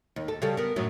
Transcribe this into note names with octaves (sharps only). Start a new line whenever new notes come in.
D#2
A4
C#3 G3 A4
B3 A#4
F#2 A2 F#3